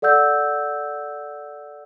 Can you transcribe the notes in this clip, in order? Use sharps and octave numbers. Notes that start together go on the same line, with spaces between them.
A4 D5 F#5 E6 G6